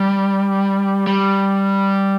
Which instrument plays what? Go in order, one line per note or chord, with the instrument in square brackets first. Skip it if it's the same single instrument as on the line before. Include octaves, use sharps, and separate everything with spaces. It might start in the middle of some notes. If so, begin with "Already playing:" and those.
Already playing: [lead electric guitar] G3
G3